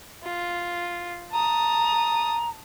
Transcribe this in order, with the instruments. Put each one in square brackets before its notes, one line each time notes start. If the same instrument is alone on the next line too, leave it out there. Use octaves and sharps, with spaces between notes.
[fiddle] F4
[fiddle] A5 D#6 [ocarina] A#5